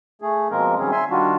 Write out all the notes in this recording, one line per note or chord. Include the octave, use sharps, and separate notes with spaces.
A3 G#4
B2 F3 G#3 A#3 C4 A#4
D#3 F#3 G3 C4 C#4 G#4
E5 G#5 C6
D#3 G3 D4 F4 F#4